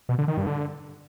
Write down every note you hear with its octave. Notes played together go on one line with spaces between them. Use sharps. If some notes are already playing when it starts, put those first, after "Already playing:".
B2
D3
D#3
G2
D3